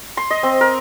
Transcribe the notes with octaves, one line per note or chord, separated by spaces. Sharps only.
C6
D#5
C4
A#4